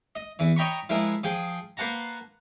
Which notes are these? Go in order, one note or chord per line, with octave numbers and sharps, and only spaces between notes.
D#5
E2 E3
C#5 D#5 G5 A#5 B5 C#6
F3 G#3 E4 A#4
F3 G#4 G5
A#3 B4 C5 F#5 A5 A#5